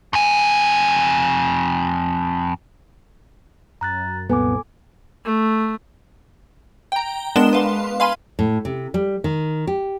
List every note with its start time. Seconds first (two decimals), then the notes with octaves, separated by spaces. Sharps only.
0.13 F2 G#5
3.81 F#2 A#5 F#6 A6
4.29 C2 F#2 A#2 B3 A4 G#5 D6
5.25 A3
6.92 G5 A#5
7.36 G#3 B3 D4 A#4 E7 G7
7.53 B4 F5 C6
8.00 F5 G#5 B5 C6 D#7
8.39 A2
8.65 C3
8.94 G3
9.24 D#3
9.67 G4